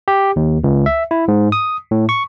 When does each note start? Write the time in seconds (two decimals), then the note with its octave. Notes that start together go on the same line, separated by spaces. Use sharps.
0.08 G4
0.36 D#2
0.64 C#2
0.86 E5
1.11 E4
1.28 G#2
1.52 D#6
1.91 A2
2.09 C#6